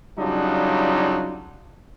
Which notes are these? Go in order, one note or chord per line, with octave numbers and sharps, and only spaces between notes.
C#3 F#3 G3 D4 D#4 F4